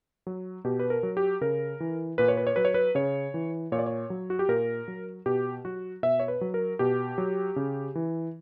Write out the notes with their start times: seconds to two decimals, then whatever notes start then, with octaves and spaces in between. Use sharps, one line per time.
0.27 F#3
0.64 B2 G4
0.79 B4
0.90 A#4
1.03 F#3
1.17 G4
1.41 C#3 A#4
1.80 E3
2.18 A#2 B4
2.28 C#5
2.37 B4
2.47 C#5
2.56 F#3 B4
2.65 C#5
2.74 B4
2.95 C#3 C#5
3.34 E3
3.72 A#2 C#5
3.79 D5
3.86 C#5
4.10 F#3
4.30 F#4
4.39 G4
4.48 A#2 A#4
4.88 F#3
5.26 B2 G4
5.65 F#3 F#4
6.03 B2 E5
6.20 C#5
6.28 B4
6.41 F#3
6.54 A#4
6.79 B2 G4
7.18 F#3
7.56 C#3
7.95 E3